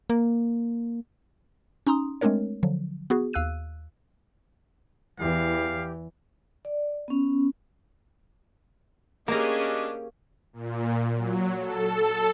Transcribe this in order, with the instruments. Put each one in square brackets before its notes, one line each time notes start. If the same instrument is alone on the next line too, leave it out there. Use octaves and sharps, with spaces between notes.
[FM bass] A#3
[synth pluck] C#4 D#4 A#5 C6 D#6
G#3 A3 C4 D4 A#4 C#5
D3 F3 F#3
B3 F#4 G#4
D#2 F5 E6 F#6 D#7
[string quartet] E2 [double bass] E3 [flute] G4 [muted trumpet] F5
[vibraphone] D5
B3 C#4
[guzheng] A#3 A#5 [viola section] C#4 G4 G#4 [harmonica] D4 D#5
[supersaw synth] A#2
F#3
A4